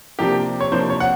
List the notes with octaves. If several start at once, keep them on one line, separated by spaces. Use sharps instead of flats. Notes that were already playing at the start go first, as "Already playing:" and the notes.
C3 F3 A#3 D4 G4
C#5
C3 F3 A#3 D4 C5
C#5
F#5